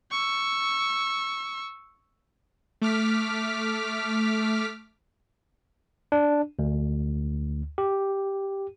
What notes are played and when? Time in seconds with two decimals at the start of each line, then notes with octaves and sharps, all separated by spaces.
0.11 C#6 E6
2.82 A3 D6 F6 B6
6.12 D4
6.59 D2
7.78 G4